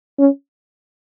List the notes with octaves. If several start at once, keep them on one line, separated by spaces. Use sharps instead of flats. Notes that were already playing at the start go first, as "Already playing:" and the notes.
C#4